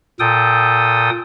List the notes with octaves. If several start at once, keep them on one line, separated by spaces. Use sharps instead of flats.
A#2 A4 G5 D#6